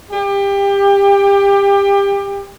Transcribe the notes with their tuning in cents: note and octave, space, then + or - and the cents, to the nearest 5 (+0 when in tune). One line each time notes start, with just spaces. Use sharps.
G4 +25